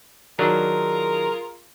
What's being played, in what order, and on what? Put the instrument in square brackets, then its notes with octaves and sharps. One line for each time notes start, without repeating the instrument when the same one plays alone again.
[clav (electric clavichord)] D#3 F#3 D4 [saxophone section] F4 G#4 A#4